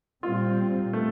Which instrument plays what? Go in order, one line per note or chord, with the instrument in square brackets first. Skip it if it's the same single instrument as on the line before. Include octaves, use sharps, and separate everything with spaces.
[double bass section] A#2 G3 C4 [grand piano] F4
[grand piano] A3